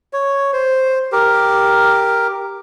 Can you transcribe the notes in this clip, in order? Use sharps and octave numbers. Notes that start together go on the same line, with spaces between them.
C#5
C5
G4 A#4